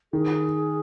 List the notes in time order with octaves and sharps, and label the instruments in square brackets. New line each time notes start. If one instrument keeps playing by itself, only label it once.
[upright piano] D#3 [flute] G#4